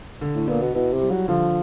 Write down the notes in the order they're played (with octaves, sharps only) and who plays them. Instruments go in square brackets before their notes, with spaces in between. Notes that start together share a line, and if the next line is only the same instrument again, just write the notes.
[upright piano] D3
[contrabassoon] A2
[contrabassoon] A#2 [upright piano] B3
[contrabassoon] B2
[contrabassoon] B2 [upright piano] E4
[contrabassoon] C3
[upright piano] G3
[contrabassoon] F#3
[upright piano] D3 [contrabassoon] F3